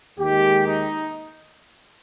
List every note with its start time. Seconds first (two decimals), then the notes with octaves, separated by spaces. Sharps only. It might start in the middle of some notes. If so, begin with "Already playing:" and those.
0.19 D#2 D#3 G#3 G4
0.67 D#4